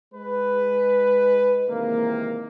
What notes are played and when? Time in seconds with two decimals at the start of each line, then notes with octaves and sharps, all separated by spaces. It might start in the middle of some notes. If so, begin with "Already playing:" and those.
0.14 G#3 B4
1.68 C3 D#3 E3 G#3 A#3